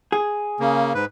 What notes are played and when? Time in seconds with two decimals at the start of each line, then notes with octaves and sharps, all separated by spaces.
0.12 G#4
0.60 C#3 A#3
0.94 G#2 B4